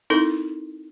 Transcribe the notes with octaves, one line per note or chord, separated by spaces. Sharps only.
C4 D#4 E4 A4 A#4